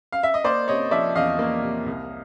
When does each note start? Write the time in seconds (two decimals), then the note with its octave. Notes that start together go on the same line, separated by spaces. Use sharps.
0.12 F5
0.23 E5
0.34 D#5
0.44 A#3 C5 D5
0.68 C3 C#5 D#5
0.91 F3 D5 E5
1.15 E2 D#5 F5
1.39 A#3
1.63 C3
1.86 C2